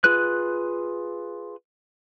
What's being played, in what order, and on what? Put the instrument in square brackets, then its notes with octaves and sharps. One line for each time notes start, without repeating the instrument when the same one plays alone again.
[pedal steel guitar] F4 G#4 B4 F#6